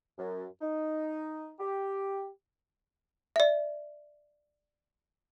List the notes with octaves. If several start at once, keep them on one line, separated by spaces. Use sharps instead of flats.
F#2
D#4
G4
D5 E5